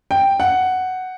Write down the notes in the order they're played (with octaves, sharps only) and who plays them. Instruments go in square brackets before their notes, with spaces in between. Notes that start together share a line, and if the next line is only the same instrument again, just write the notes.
[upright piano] G5
F#5